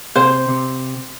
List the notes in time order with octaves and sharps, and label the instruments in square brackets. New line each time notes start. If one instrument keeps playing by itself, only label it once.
[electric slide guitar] C3 [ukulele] C5
[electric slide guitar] C3